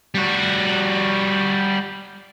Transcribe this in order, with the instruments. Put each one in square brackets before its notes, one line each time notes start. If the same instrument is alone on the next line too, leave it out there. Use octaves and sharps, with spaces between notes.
[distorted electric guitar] G3 F#4